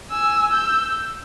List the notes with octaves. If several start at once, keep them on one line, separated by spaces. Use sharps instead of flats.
G#5 E6
E6 G6